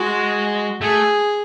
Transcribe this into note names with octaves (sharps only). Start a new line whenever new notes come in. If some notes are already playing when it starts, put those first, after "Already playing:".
Already playing: G#3 F#4
A3 G#4